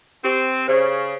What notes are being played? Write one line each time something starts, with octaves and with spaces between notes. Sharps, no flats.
C4 G4
C#3 C5 D5